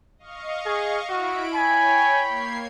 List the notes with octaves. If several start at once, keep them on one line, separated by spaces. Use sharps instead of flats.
D#5 F5 C#6
G#4
E4 F#4 B5 D7
C#5 G5 G#5 B5
A#3 G#6 C7